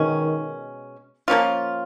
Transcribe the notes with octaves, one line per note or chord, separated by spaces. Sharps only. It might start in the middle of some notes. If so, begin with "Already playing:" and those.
Already playing: B2 D#3 G#3 C#4
F3 A#3 C#4 F4